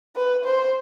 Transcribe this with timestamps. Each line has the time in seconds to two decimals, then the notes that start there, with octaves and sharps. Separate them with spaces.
0.16 B4
0.45 C5